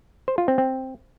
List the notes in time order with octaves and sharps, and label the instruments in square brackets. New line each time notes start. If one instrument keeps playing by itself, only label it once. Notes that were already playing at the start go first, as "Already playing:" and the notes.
[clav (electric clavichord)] C5
F4
C4
C4